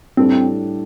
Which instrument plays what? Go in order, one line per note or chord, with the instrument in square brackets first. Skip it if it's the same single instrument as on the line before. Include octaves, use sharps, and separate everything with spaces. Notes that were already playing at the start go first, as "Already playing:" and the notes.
[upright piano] A2 G3 D4 A4 [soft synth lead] C4